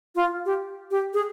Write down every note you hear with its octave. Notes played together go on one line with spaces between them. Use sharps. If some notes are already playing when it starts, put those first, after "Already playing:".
F4
G4
G4
G#4